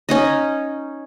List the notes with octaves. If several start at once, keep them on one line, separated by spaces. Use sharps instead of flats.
C#4 D#4 D#5